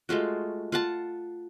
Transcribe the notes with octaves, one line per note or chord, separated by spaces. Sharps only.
G#3 A3 F4 F#4
F4 F#5 A5